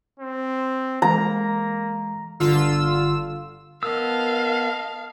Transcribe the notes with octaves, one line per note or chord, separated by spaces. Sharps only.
C4
E3 G#3 A#3 A#5
G1 D3 F4 E6
B3 A#4 D#5 F5 A5 E6